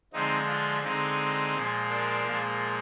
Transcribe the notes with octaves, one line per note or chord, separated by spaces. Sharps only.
D3 F3 G#3 C4 D#4
D4 F4
D3 G#3 C4 D#4
A#2 F3 G#3
A#3 D4
A#2 F3 G#3